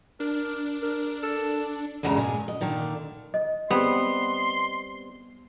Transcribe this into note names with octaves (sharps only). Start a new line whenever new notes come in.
D4 A#4
A#4
A4
E2 G2 C#3 G#3 A5 A#5
A#2 G#3 G#5
D#5
A#2 D3 D#3
D#5
G3 B3 C4 C6